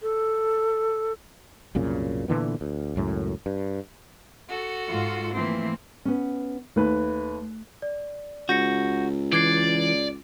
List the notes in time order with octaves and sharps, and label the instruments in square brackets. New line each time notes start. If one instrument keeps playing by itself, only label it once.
[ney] A4
[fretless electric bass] C2 F#2 A#2 C#3
A#2 D3 E3 B3
D2
C#2 F#2 A2
G2
[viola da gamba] F#4 A4
[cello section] G#2 F4
[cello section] E3 F3 A3 [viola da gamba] A#3 C4
[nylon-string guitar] B3 C#4
[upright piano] D#2 B4 [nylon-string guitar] A3
[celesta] D5
[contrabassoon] C#2 [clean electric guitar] F#4 [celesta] G6 A#6 C#7
[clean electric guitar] E3 [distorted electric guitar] D5 [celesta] D6 G#6 C7